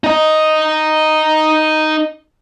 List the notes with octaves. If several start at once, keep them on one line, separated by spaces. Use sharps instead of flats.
D#4 D#5